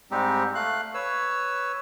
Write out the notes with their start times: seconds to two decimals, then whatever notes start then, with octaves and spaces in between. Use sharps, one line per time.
0.11 G#2 G3 G#3 C4 D#4 G4
0.55 A3 F5 F#6
0.94 B4 C#5 E6